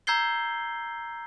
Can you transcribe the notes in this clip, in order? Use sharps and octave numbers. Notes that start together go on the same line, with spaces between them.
A#5 E6 G6 G#6 C7 G7